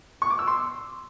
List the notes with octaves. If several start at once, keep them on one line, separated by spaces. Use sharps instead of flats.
C#6
D6
E6
C6